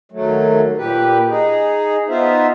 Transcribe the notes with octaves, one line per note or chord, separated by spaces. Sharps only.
D#2 F#3 A3
A#2 G4 B4
D#4 G#4
B3 D#4 F4 C5 E5